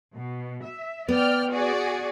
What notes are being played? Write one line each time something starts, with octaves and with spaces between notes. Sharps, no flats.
B2
E5
B3 D5 G5 F6
F#4 G#4 D5